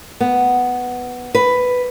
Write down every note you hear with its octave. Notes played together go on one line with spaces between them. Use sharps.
B3
B4